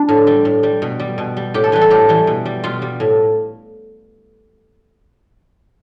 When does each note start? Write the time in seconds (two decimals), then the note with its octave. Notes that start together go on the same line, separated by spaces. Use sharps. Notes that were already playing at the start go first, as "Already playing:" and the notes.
Already playing: D4
0.09 A2
0.27 G3
0.45 A2
0.63 G3
0.82 B2
1.00 G3
1.18 B2
1.37 G3
1.54 A2 G4
1.64 A4
1.72 E3 G3 B4
1.81 A4
1.90 A2 G4
2.09 E3 G3
2.27 B2
2.46 G3
2.64 B2 F4
2.82 G3
3.00 A2